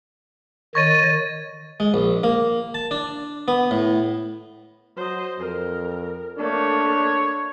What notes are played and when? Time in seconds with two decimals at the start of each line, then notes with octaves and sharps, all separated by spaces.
0.75 D#3 C#5 D#5 C#6 A6 D#7
1.80 G#3
1.94 A#1
2.23 A#3
2.74 A5
2.91 D4
3.48 B3
3.71 A2
4.97 F#3 C5 D#5
5.39 F2 A#4
6.38 A3 A#3 D4 C#5